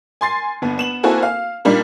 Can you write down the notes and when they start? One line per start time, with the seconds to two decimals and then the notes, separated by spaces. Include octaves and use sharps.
0.21 G#5 C6 A6 C7
0.62 G1 B3
0.77 B3 E7 F#7
1.03 A#3 C4 E4 F#4 A4 G#5
1.23 F5
1.65 A#2 G3 A#3 D4 D#4